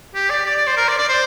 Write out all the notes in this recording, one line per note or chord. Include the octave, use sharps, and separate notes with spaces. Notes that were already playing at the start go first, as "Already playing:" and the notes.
G4
D5
D5
D5
C5
A#4
D5
D5
C5